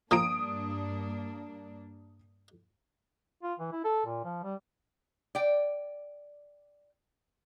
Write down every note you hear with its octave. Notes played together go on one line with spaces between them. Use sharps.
G2 A#2 F3 A#3 D4 A#4 D#6 D7
F4
E3
E4
A4
A#2
F3
G3
D5 G5